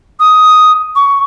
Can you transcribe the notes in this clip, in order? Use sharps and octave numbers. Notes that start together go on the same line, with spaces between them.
D#6
C#6